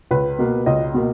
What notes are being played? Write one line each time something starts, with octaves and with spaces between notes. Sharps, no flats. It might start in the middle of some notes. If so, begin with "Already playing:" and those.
C#2 B4
B2 A#3
C#2 D#5
B2 A#3